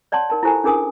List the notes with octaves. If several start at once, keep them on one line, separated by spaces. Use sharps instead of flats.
C#5 D5 F#5 A5 C6
D#4 A#4 A5
E4 F4 G4 A4 C5 G#5
C#4 D4 G#4 A#4 G#5 D#6